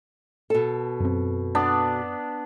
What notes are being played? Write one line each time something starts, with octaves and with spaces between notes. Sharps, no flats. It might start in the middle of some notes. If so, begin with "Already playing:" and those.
B2 A4
F#2 C4
B3 D4